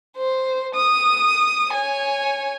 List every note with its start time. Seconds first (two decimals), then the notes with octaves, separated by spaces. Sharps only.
0.17 C5
0.75 D#6
1.72 C#5 G#5